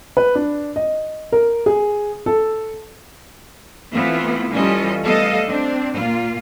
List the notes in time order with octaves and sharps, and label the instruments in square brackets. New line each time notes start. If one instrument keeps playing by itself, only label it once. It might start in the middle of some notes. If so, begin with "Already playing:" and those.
[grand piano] B4
D4
D#5
A#4
G#4
A4
[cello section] E3 A3 B3 C4 E4 F4
E3 G3 C#4 F4 A4 D#5
G3 A3 B3 A4 D#5 F5
C4 D4
A#2 A#3 F4